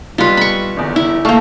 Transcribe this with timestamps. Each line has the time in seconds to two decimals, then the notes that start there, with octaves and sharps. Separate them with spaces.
0.18 B1 G3 F4 B4 C6
0.37 B5 C#6
0.76 G1 E2
0.96 E4
1.25 A3 A#3 F5 A5 C#6